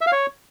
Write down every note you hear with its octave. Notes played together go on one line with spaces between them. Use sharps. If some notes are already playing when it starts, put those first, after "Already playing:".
E5
F5
C#5